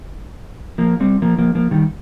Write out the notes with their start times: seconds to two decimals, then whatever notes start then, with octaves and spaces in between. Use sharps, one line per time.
0.78 F3 A#3
1.00 G3 C4
1.22 F3 A#3
1.39 F3 A#3
1.55 F3 A#3
1.71 D#3 G3